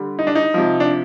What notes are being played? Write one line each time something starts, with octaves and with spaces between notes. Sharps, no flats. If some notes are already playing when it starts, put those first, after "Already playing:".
Already playing: D3 G3
D#4
D4
D#4
C3 F3
D4